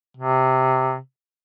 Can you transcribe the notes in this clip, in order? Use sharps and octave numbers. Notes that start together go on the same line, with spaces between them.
C3